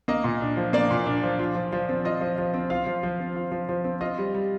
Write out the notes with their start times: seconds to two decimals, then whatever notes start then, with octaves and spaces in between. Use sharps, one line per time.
0.08 A#3 D#5
0.24 A#2
0.41 D4
0.57 F3
0.73 A#3 D5
0.91 A#2
1.06 D4
1.23 F3
1.39 F4
1.55 F3
1.73 F3
1.89 C4
2.05 F4 D#5
2.21 F3
2.38 F3
2.54 C4
2.70 F4 F5
2.86 F3
3.03 F3
3.20 C4
3.36 F4
3.52 F3
3.69 F3
3.84 C4
4.01 F4 D#5
4.18 G3
4.34 G3